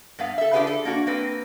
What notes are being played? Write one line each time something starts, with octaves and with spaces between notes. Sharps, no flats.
G2 B3 F5
A4 E5
D4 F4 G4 G#4 B4 F5
A4
A#3 D4 F#4
A#3 C4 B4